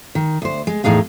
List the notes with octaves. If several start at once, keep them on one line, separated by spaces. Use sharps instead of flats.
D#3
D2 C5
G#3
E2 A2 D#4 G#4 F5